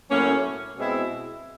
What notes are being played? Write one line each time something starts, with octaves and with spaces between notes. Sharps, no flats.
A2 F#3 A#3 C#4
B2 G#3 C4 E4